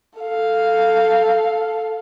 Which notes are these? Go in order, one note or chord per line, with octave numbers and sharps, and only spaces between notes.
A4 F5